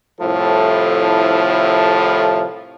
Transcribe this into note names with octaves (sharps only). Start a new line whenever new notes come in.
C2 A2 F3 E4 A4